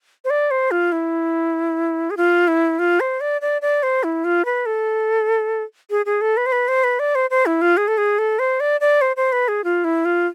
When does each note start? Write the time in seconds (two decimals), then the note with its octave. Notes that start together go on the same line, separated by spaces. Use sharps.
0.25 C5
0.30 D5
0.51 C5
0.71 F4
0.92 E4
2.10 G#4
2.17 F4
2.48 E4
2.79 F4
3.00 C5
3.21 D5
3.41 D5
3.62 D5
3.83 C5
4.04 E4
4.24 F4
4.45 B4
4.66 A4
5.90 G#4
6.06 G#4
6.21 A4
6.37 B4
6.46 C5
6.52 B4
6.68 C5
6.84 B4
6.99 D5
7.15 C5
7.30 C5
7.46 E4
7.62 F4
7.77 G#4
7.88 A4
7.98 G#4
8.19 A4
8.39 C5
8.60 D5
8.81 D5
9.01 C5
9.16 C5
9.32 B4
9.48 G#4
9.64 F4
9.84 E4
10.05 F4